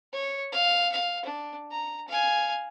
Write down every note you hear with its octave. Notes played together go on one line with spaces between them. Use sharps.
C#5
F5
F5
D4
A#5
F5 G#5